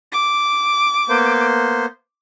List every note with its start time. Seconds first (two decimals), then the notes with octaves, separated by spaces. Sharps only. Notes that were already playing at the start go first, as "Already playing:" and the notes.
0.12 D6
1.09 A#3 B3 C5